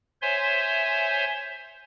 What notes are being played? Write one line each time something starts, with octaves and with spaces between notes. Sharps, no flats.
C5 C#5 E5 G#5 C6